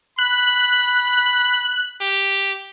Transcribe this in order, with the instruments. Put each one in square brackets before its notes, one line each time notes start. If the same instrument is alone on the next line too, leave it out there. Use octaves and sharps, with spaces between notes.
[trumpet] B5 [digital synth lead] F#6
[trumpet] G4